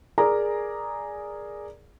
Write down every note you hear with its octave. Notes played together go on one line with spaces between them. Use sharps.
G#4 A#4 D5 A#5